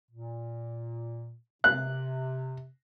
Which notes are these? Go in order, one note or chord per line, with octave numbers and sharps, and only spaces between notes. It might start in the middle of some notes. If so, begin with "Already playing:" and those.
A#2
C3 F#6